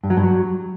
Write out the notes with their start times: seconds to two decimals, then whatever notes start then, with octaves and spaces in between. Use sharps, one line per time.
0.04 G2
0.10 F#3
0.17 G2
0.23 F#3